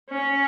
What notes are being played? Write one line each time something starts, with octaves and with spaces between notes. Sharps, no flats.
C#4